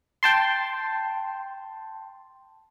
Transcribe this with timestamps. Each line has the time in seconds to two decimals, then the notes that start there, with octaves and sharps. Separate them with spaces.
0.23 G5 A5 C6